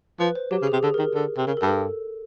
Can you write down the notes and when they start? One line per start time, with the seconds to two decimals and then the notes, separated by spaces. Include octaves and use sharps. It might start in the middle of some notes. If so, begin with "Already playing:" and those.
0.19 F3 B4
0.35 C5
0.51 F#3 G4
0.62 C#3
0.67 G#4
0.72 C3
0.83 D3 G#4
0.94 A#4
0.99 D#3
1.15 D3
1.38 C3
1.47 C#3 A#4
1.57 A4
1.62 G2
1.68 A4